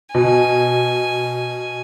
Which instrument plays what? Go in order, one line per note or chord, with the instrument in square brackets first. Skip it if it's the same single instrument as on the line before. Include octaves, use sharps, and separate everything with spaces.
[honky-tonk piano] B2 [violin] G#5